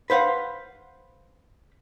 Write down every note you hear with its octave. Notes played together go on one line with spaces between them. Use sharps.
B4 C5 F5 F#5